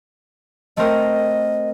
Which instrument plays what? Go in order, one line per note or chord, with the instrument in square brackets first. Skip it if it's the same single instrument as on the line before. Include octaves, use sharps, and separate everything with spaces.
[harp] A3 C4 A#4 [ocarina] D#5